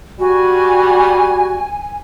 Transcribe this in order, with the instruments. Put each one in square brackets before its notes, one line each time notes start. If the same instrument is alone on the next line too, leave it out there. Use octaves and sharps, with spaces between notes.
[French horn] G3 [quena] F#4 [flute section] G#5